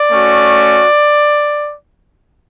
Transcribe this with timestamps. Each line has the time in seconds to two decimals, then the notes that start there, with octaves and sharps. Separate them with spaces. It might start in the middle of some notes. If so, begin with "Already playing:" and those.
Already playing: D5
0.11 A3 C#4 F#4